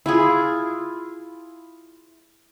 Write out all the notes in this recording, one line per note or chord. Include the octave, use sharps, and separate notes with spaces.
E4 F4 G#4